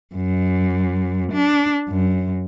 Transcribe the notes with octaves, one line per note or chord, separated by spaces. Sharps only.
F#2
D4
F#2